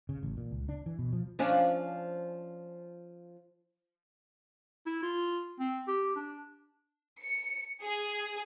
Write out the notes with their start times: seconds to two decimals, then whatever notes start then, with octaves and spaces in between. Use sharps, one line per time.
0.09 C#3
0.23 A1
0.37 A#2
0.51 C#2
0.69 D4
0.86 E3
0.99 B2
1.13 F3
1.39 F3 C#4 D4
4.86 E4
5.03 F4
5.59 C4
5.87 G4
6.16 D4
7.22 C#7
7.83 G#4